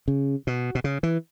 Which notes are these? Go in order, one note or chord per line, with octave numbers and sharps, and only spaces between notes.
C#3
B2
B2
C#3
E3